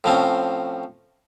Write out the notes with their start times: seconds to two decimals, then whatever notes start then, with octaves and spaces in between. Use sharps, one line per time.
0.04 A2 F3 C4 C#4